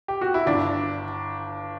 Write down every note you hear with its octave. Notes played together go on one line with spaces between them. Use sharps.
G4
F#4
E4
G1 D4